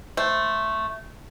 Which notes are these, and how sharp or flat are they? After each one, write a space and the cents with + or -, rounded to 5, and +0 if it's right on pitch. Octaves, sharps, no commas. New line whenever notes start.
A3 +0 C5 +0